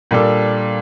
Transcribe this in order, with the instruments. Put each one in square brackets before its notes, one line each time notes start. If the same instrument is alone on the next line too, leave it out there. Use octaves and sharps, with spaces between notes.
[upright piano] A#2 G3 D4 A4